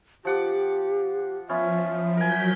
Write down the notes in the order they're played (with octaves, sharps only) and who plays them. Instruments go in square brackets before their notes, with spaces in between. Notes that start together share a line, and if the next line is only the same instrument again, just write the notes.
[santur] F3 F#5 D6 [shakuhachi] G4
[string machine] F3 [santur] B3 C#4 F4 [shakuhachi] E5
[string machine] F#3 G6 B6 [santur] A#4 G#5